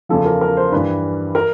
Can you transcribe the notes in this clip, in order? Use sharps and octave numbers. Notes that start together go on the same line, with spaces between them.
E2 C#3 F3 A4
A#4
A#4
C5
G2 E3 B4
A#4